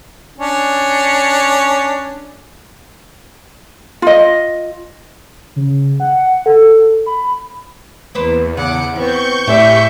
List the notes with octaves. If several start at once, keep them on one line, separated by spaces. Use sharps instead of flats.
C#4 D4
F4 D#5
C#3
F#5
A4
B5
E2 A#3 B4 C5
C#3 F#5 D6
E3 B3 C4 C#6 G6
A2 G4 G#4 D5 E5 D6